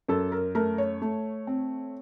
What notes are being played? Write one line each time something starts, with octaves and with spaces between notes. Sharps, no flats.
F#2 A4
A#4
A3 A#4
C#5
A3
C4